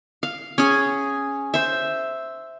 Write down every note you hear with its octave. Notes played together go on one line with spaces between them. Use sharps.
F5
C#4 G#4
C5 E5